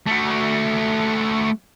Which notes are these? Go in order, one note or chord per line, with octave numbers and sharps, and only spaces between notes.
A3 F#4